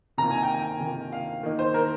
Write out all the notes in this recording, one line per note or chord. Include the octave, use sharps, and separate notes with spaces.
C3 D#3 A#3 F4 A#5
G#5
G5
G#5
C3 D#3 A#3 F4
F5
D#3 A#3 D#4
C5
A#4